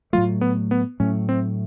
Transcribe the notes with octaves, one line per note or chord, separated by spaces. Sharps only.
A2 F#3 A3 F4
B3
B3
A2 F#3 A3 C#4
C4